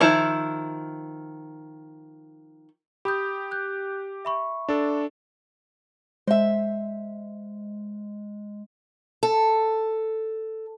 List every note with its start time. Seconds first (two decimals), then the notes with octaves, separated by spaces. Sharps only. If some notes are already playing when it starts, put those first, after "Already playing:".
0.01 D#3 F3 E4
3.05 G4 B5 D#6 G6
3.51 F#6 G6
4.25 E5 B5 C#6
4.69 D4 A4
6.27 G#3 C5 E5
9.23 A4